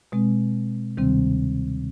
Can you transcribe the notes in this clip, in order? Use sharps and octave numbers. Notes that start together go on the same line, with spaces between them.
B2 G#3 C4
D2 C3 D#3 G3 C4